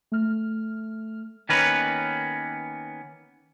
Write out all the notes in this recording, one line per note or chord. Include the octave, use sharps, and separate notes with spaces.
A3 F6
D#3 A#3 B3 C#4 A#4 B4